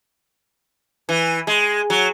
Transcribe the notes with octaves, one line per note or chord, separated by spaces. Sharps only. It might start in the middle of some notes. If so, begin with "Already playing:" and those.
E3
G#3
F#3